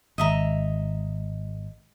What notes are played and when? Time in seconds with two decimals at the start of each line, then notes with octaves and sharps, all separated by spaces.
0.18 G#1 D#5 E5 A#5